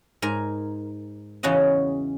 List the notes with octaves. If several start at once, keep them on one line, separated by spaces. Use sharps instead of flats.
G#2 A#4 G#5
E2 C#3 C#4 F#4 D#5